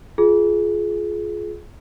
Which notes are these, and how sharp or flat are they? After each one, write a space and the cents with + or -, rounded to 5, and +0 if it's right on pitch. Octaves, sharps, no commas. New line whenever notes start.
F4 +0 G#4 +25